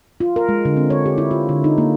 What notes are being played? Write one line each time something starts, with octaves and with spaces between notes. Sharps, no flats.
F4
A#4
G#3
D3
C4
C#5
G4
E4
F4
D3
D#4
A#3